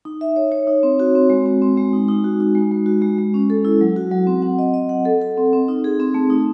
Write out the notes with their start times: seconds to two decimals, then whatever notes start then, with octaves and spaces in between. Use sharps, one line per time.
0.05 D#4
0.21 E5
0.36 C#5
0.52 C#5
0.67 D#4
0.83 C4
1.00 F#4
1.15 C4
1.30 G#3
1.46 C4
1.62 C4
1.77 G#3
1.93 D#4
2.08 D#4
2.24 F#4
2.40 D#4
2.55 G#3
2.71 G#3
2.86 F#4
3.02 G#3
3.18 G#3
3.34 C#4
3.50 A4
3.65 E4
3.81 F#3
3.96 F#4
4.11 F#3
4.27 C4
4.42 F#5
4.59 D#5
4.74 D#5
4.89 F#5
5.05 A4
5.22 A4
5.37 C4
5.53 C4
5.68 D#4
5.84 G#4
6.00 C4
6.14 A3
6.30 D#4